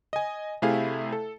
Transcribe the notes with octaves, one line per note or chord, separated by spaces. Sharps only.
D#5 G#5
C3 A3 E4 G#4 F5
A4